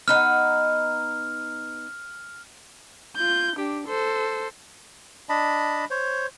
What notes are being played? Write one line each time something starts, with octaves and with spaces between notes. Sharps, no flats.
B3 D#4 F#5 F6
F4 G6
D4 G4
A4 C5
D4 D#5 A5 B5
C5 C#5